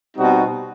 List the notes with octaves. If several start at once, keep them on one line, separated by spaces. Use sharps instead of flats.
B2 G3 C4 D#4 F#4